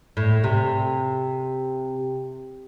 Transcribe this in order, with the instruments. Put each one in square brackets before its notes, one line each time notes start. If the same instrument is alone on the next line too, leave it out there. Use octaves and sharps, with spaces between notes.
[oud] A2
C3